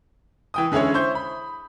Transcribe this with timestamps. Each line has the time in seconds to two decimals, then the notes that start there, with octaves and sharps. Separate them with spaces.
0.54 E3 G5 D#6
0.72 D3 G#3 C#4 E4 C#5
0.94 E4 C5 C#6 G6
1.15 B5